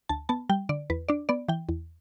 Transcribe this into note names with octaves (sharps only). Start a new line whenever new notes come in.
D2 A5
B3 A5
G3 G5
D3 D5
E2 B4
D4 D5
B3 D5
E3 G5
E2